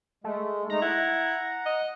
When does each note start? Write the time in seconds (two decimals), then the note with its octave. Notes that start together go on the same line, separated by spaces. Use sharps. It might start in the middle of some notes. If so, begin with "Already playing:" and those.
0.24 G#3 A3
0.70 G#3 A3 D#4 A#5
0.82 E4 F#5
1.66 D#5